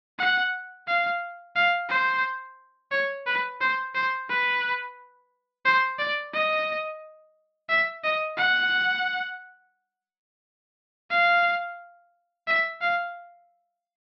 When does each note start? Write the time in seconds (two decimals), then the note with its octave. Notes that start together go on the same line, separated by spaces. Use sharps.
0.19 F#5
0.87 F5
1.56 F5
1.89 C5
2.92 C#5
3.26 B4
3.61 C5
3.95 C5
4.29 B4
5.65 C5
5.99 D5
6.33 D#5
7.69 E5
8.04 D#5
8.37 F#5
11.10 F5
12.47 E5
12.81 F5